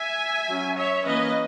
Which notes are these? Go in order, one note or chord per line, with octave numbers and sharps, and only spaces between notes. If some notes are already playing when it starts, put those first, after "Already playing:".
Already playing: E5 G#5
F#3 C#4
C#5 E5
E3 A#3 C#4 B4 D#5